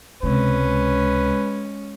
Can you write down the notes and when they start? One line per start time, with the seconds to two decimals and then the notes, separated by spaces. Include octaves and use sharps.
0.23 C#2 C3 G#3 C4 C#4 B4
0.61 G#3